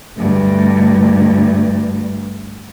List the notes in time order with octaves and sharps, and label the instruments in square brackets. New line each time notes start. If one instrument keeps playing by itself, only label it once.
[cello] D2 G2